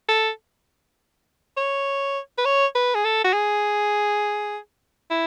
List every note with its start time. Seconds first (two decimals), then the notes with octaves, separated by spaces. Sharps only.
0.09 A4
1.57 C#5
2.38 B4
2.45 C#5
2.75 B4
2.95 G#4
3.05 A4
3.24 F#4
3.33 G#4
5.11 E4